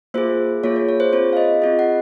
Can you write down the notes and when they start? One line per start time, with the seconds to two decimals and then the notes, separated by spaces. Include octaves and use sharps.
0.14 A#3 F4 G#4 C5
0.64 A#3 F4 G#4 C#5
0.76 C#5
0.89 C#5
1.00 C5
1.13 C4 F4 G#4 C5
1.33 F5
1.37 D#5
1.62 C4 F4 G#4 D#5
1.79 F#5